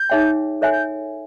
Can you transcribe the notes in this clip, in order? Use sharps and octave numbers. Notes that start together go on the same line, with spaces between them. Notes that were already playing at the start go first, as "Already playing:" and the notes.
Already playing: G6
D#4 G#4 C#5 E5 G5
A4 C#5 E5 G#5 F#6
G6